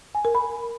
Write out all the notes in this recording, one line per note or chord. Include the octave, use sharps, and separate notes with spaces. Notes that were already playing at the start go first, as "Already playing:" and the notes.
G#5
A#4
B5